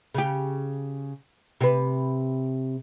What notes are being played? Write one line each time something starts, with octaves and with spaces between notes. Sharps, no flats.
C#3 G4
C3 B4